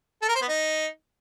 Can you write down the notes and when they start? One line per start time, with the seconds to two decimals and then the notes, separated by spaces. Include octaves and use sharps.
0.22 A4
0.28 A#4
0.35 C5
0.41 B3
0.48 D#4